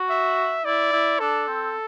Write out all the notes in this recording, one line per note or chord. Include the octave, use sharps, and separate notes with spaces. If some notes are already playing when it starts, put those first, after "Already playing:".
Already playing: F#4
E5
E4 D5
E4
D4 A4
C4